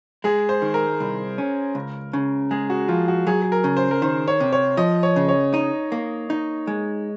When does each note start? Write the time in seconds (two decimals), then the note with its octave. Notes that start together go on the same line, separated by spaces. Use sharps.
0.24 G#3 G#4
0.49 C5
0.62 D#3
0.74 A#4
1.00 C2
1.38 C#4
1.75 C#2
2.13 C#3
2.51 G#3 G#4
2.70 F#4
2.88 F3 F4
3.08 F#4
3.27 F#3 G#4
3.42 G#4
3.52 A#4
3.64 C#3
3.77 C5
3.91 A#4
4.02 D#3 C5
4.28 C#5
4.40 C3
4.53 C#5
4.77 F3 D#5
5.03 C#5
5.16 C#3
5.29 C#5
5.54 D#4
5.92 A#3
6.30 D#4
6.67 G#3